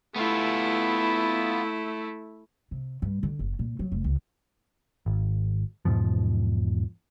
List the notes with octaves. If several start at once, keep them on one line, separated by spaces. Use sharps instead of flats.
A3 B3 E4 F4
C3
G2
D3
F#1
A#2
F#3
F1
C#2
G#1
E2 G#2 B2 F3